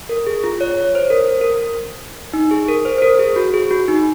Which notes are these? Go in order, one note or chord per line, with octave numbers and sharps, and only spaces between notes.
A#4
G#4
F4
C#5
C#5
C5
A#4
C5
A#4
D#4
G#4
A#4
C5
C5
A#4
G#4
F#4
G#4
F#4
D#4